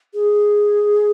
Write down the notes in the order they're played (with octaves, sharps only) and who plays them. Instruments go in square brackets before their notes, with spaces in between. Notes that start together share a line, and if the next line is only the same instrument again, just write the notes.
[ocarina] G#4